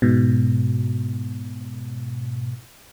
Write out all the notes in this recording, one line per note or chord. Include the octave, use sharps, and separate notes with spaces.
G#2 B2